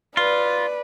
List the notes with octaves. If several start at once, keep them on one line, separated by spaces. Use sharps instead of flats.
F4 B4 D5